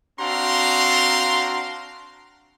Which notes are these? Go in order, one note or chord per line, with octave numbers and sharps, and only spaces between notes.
C4 D4 F#4 F5 A#5 C6